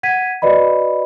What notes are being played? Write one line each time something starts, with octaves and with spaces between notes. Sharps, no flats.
F#5 G#6 B6 D#7
F#4 B4 D5 D#5 B5